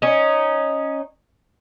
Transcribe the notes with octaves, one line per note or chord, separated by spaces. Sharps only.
C#4 D#4